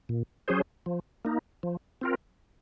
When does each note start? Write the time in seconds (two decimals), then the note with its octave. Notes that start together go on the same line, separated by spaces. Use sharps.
0.09 A#2
0.48 F#3 C#4 G#4 C5
0.86 F3
1.25 A#3 D#4
1.63 F3
2.01 C4 F4 A#4